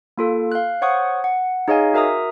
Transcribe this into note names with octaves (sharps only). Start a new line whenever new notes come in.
A#3 F4 A4
F5 F#6
C5 C#5 F#5 C#6 D#6 F#6
F#5
D#4 G#4 C#5 D#5 F5 G#5
F#4 A#4 E5 A#5 D#6